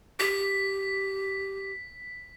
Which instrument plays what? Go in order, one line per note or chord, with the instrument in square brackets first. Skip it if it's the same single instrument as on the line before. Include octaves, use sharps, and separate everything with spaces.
[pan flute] G4 [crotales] B6